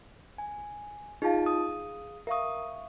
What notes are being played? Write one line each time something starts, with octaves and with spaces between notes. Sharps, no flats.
G#5
D#4 F4 G#4 F5 A5
D#6
A#4 E5 F5 C#6 D#6